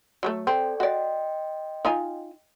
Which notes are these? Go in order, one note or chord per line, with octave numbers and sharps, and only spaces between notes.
F#3 G3 A3
C4 A4 D5 G5
F#4 D5 D#5 G5 C6
D#4 F4 G#5